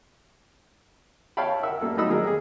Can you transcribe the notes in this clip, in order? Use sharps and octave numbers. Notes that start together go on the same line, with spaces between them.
C#5 E5 F5 G5 A5 B5
A#4 E5 F#5 E6
G3 A#3 A4
F#3 A3 D#4 D#5 B5 E6
F#3 A#3 G#4 A#4 D#5
G4 G#4